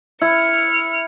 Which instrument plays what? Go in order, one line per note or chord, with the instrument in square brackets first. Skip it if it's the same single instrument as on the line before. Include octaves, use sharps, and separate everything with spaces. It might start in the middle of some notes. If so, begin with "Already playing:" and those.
[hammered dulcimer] E4 [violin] F6 C#7